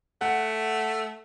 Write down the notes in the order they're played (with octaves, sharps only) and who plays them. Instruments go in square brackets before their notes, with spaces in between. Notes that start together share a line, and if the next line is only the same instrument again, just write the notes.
[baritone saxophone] A3 [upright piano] F#5